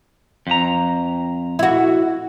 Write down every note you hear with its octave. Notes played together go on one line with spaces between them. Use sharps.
F2 A#5
E4 F#4